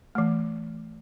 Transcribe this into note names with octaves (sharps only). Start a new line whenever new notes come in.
E3 A3